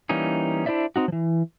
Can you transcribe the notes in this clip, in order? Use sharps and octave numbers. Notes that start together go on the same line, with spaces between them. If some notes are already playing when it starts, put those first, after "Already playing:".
E3 G3 A#3 C#4 D#4
D4 E4 C5 D5 E5
C4 D#4 F#4
E3 F3